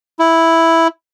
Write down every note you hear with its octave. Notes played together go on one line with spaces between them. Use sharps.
E4